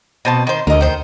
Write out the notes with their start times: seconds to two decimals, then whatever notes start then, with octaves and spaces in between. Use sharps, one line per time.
0.25 B2 C4 A5
0.47 D#3 C5
0.67 D2 A#4 D#5
0.81 D#3 C5